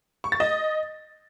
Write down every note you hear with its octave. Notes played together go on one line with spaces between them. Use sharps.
C#6
A6
D#5